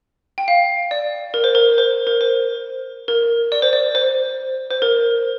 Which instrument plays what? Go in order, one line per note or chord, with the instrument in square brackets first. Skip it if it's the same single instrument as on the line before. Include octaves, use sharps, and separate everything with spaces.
[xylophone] G5
F5
D5
A#4
C5
A#4
C5
A#4
C5
A#4
D5
C5
D5
C5
C5
A#4